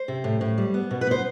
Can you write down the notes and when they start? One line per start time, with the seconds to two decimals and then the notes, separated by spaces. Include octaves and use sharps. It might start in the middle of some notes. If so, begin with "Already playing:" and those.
Already playing: C5
0.08 C3
0.24 A2
0.41 A2
0.58 G3
0.74 B3
0.91 B2
1.01 B4
1.07 B3 C5